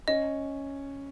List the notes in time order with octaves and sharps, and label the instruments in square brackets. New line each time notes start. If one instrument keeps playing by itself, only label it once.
[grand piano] C#4 [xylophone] D#5